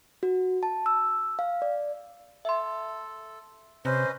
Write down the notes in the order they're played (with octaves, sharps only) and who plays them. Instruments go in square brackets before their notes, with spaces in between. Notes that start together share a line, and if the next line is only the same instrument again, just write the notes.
[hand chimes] F#4
A5
E6
F5
D5
[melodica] A4 [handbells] E5 C6
[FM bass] C3 [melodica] C#4 B4 D#5 [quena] C5